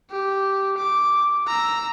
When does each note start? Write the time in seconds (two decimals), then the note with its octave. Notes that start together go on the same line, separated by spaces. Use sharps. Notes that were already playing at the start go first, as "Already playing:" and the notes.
0.11 G4
0.78 D6
1.47 A#5 E6